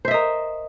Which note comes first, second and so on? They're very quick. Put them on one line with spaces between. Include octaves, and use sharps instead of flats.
C5 E5 D#5 A#4